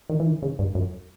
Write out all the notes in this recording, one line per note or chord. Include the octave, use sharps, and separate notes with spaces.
D#3
E3
D#3
C#3
G2
F#2